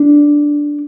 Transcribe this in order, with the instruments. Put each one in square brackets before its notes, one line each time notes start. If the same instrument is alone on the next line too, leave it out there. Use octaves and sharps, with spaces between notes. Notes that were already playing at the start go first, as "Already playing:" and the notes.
Already playing: [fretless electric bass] D4